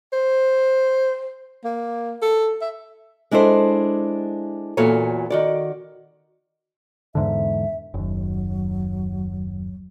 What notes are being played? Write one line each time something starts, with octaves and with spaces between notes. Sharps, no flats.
C5
A#3
A4
E5
G#3 D4 E4 A4 C5
E2 A#2 F#4 A4 C#5 G#5
D#3 F#4 D5
E2 G#2 D3 E5
F#1 D#2 F#3